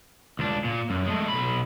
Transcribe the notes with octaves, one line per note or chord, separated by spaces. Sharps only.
C#2 D4
A#2
F#2
G#3 A3
B1 B5